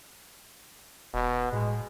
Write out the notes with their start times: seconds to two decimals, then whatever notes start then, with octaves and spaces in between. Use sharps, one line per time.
1.13 E1 B2
1.52 A2 G#3